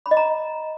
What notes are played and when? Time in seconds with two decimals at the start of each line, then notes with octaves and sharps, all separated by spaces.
0.06 B5
0.11 D#5
0.17 A#5